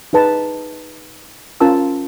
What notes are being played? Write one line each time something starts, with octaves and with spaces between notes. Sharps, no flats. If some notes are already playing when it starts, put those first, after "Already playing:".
D#4 G#4 B4 A5
C#4 F4 A#4 A5 E6